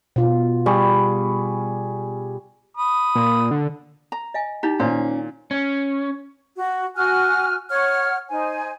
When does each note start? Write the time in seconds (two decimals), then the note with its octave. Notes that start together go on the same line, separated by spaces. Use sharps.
0.16 B2 F4
0.66 G3 G#4 C#6
2.77 B5 D#6
3.15 A#2
3.51 D3
4.12 A#5
4.34 D#5 F5 G#5
4.63 D#4 E4 G4 A#5
4.80 A#2 D#3 C#4 C5
5.51 C#4
6.56 F#4
6.96 F#4 G#5 F6 F#6
7.69 C#5 F#5 F6
8.30 D#4 C5 G#5